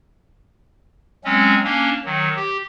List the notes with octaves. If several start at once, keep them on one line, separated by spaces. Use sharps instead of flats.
F#3 G#3 C4 C#4
A#3 C#4 D4
D#3 F#3
G4